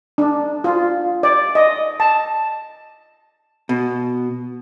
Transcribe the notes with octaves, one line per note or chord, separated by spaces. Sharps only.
D4
F4
D5
D#5
A5
B2